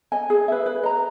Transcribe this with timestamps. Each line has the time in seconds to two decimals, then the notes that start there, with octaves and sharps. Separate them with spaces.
0.12 D#5 G#5
0.30 G#4
0.48 B4 E5
0.66 B4
0.83 D#5 A#5